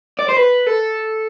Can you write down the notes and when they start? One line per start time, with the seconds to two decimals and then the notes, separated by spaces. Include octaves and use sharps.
0.19 D5
0.29 C5
0.36 B4
0.66 A4